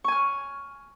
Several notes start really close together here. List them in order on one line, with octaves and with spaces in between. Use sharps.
C#6 G#5 F6